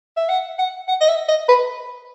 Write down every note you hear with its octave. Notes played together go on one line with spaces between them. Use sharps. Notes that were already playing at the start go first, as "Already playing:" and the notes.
E5
F#5
F#5
F#5
D#5
E5
D#5
B4